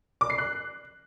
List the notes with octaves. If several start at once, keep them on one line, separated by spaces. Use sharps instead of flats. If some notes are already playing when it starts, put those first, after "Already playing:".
D6
C7
F#6